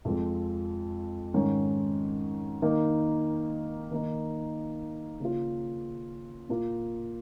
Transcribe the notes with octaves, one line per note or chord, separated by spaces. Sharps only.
F2 F3 G#3
G#2 D#3 C#4
D#3 A#3 D#4
D#3 A#3 D#4
C#3 A#3 C#4 F4
A#2 A#3 F4